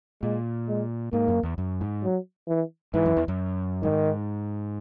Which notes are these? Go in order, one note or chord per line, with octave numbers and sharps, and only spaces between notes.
A#2 G#3
G#3
G#2 A#3
F#2
E2
F#2
G#2
F#3
E3
G#2 E3
F#2
E2
F#2
G#2 D#3